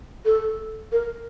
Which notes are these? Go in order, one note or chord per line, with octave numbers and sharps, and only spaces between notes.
A4
A#4